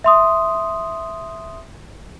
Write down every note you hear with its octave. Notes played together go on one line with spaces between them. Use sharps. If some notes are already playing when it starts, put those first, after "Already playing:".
E5 C6 D#6